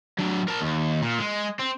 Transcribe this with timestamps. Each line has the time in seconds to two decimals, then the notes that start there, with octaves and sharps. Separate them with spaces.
0.19 F#3 D4
0.48 A#4 A5
0.61 D#2
1.02 A#2
1.19 G#3
1.59 C4